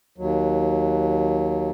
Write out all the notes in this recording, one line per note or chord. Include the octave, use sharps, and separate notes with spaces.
D#2 F#3